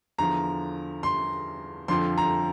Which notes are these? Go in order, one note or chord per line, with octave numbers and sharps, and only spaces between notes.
E2 D3 F3 A#5
C6
F2 D3 F3 C6
A#5